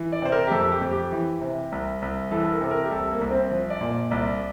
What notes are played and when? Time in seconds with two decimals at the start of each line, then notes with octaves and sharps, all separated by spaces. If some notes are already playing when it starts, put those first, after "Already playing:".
Already playing: E3
0.12 D5
0.22 C3 C5
0.32 A#4
0.47 G4
0.51 F2 A4
0.72 G4
0.82 F2
0.91 G4
1.12 E3
1.41 C3
1.72 C2
2.02 C2
2.31 E3 A4
2.43 A4
2.52 A#4
2.61 C3 A4
2.71 A#4
2.84 G4
2.91 C2 A4
3.11 A#3
3.21 C2
3.31 C4
3.51 F3
3.70 D5
3.81 A#2
3.90 D5
4.10 C2 D5